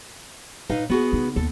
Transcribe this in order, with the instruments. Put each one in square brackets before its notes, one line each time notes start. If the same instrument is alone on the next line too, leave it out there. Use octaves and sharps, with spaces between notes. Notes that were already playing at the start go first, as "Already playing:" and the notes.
[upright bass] A#2 [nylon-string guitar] D#4 B4 F5
[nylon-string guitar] B3 F#4 G#4 [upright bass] F4
[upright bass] C#3 D#4
[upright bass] D#2 [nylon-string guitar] A4